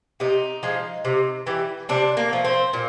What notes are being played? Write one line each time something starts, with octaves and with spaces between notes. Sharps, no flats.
C3 D#4
F3 G#3
C3
E3 G3
C3 D4
A#3
F3 A3
C4
A#2